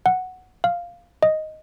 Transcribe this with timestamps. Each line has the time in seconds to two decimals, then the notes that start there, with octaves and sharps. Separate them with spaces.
0.06 F#5
0.64 F5
1.23 D#5